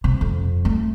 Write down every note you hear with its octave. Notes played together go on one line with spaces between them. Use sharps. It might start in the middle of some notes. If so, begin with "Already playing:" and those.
C3
F2
A3